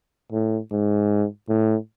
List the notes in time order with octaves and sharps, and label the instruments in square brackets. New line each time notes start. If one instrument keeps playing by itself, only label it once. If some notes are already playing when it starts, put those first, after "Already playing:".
[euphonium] A2
G#2
A2